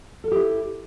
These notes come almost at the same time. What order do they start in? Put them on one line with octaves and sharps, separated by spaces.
A4 A#4 G4 E4